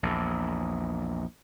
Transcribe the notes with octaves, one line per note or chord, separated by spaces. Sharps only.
A#1 E2